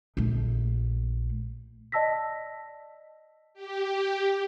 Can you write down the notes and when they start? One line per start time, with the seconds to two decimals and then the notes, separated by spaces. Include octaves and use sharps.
0.17 A#1 A3
1.92 D5 D#5 A5 E6 A#6 B6
3.54 G4